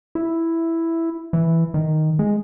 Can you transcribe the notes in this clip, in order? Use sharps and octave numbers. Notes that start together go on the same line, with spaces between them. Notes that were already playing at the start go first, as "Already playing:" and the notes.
E4
E3
D#3
G#3